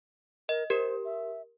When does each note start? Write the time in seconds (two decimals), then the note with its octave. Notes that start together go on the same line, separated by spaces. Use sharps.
0.49 A#4 D#5
0.70 G4 A#4 C5
1.05 E5